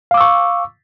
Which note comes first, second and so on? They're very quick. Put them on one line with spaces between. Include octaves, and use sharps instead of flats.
F5 D6 E6 C#6